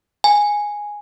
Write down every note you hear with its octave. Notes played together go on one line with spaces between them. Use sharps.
G#5